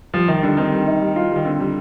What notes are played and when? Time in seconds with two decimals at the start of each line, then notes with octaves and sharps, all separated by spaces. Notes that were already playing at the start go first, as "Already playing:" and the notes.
0.14 F3 G3
0.28 D#3 D#4
0.43 D3 G3
0.57 D#3 C4
0.72 G3
0.87 D#4
1.01 G3
1.16 F4
1.31 D#3 G3
1.45 D3 C4
1.60 G3